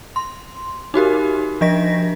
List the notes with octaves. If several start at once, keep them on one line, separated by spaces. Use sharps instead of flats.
C6
D#4 F#4 G4 A#4
F3 D4 D#5 A#6 B6